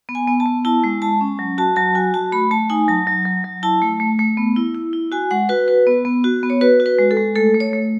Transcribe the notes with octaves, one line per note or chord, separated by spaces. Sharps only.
B3
G#5
B3
A5
B3
E4 A5
G#3
G#3 A5
C#4
F#3
F#4 A5
F#3 A5
F#4 G#5
F#4 A5
A3 B5
A3 A5
D#4 G#5
F#3 A5
F#3
F#3
F#3
E4 A5
A3
A3
A3
B3
E4
E4
E4
F#4 G#5
G#3 F#5
F#4 B4
F#4 B4
B3
B3
F#4
B3
C#5
F#4 B4
F#4
B4
G#3
A4
G#3
A3 A4
A3
C#5
A3